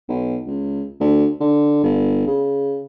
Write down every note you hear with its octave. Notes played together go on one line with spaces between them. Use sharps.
B1
C#2
D2
D3
G1
C#3